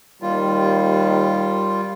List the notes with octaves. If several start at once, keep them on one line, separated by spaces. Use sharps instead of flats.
D#2 G3 F4